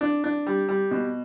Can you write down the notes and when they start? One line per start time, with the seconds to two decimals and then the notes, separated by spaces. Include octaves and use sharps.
0.01 D4
0.24 D4
0.46 G3
0.68 G3
0.91 B2